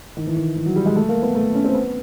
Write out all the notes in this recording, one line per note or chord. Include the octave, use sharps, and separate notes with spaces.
D#3
E3
D#3
E3
F#3
G3
G#3
A3
A#3
B3
A3
C#4
C4
B3